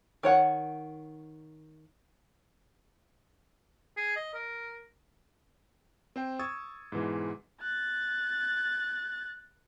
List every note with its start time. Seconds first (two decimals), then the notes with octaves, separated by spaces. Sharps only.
0.23 D#3 C#5 F#5
3.97 G#4
4.16 D#5
4.34 A#4
6.16 C4 C5 G5
6.39 C#6 D#6 E6 G#6 A6
6.92 G#2 B2 E3 G#3
7.62 F#6 A6